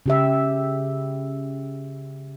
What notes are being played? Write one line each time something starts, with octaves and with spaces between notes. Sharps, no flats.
C#3 G4 E5